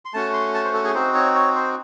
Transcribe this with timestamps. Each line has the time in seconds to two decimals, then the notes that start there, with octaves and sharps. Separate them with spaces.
0.05 C6
0.14 A3 C#4 F#4 A5
0.33 C6
0.54 A5
0.64 C5
0.74 A4
0.84 G#4
0.94 C4 D#4 F#4 C5
1.15 C#5
1.35 C#5
1.55 C5